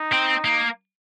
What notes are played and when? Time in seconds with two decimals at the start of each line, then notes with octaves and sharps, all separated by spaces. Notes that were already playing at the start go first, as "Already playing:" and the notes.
Already playing: D#4
0.13 C4
0.44 A#3